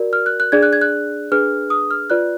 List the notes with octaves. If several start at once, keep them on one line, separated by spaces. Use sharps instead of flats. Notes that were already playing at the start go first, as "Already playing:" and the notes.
Already playing: F#4 A#4 D5
F6
F#6
F#6
D4 G#4 D5 G#6
F#6
G#6
F#6
D4 G#4 B4 F6
D#6
F6
F4 B4 D5 F#6